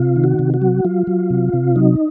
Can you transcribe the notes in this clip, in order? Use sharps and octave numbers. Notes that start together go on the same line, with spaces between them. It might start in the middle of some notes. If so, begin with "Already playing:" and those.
Already playing: C3 F4
D#3
F#4
C3
F#4
F#3
F#3 F4
F#3
C3
C3
F#3 D#4